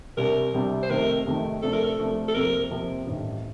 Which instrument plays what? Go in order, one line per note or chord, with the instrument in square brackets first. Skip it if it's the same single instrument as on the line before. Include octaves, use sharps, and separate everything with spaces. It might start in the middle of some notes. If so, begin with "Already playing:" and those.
[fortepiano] C2 C3 G3 D4 [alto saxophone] A#4
[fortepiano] C2 C3 G3 D4
[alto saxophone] C5
[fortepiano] F2 C3 D#3 A3 [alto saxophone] A#4
[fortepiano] F2 C3 D#3 A3
[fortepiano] C3 F3 A3 D4 [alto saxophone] A4
[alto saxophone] A#4
A4
[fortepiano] C3 F3 A3 D4
[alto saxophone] A4
[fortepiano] F2 C3 F3 A#3 [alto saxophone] A#4
[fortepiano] F2 C3 F3 A#3
A1 G2 D#3